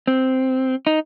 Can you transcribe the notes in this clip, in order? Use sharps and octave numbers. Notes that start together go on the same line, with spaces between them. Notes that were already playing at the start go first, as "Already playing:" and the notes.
C4
D#4